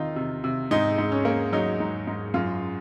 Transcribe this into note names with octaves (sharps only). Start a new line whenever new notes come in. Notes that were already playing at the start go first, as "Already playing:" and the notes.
Already playing: C3 D#3 D#4 F4
C3
C3
G#2 D#4
G#2
C#4
A#3
F#3 D#4
G#2
G#2
F#2 F4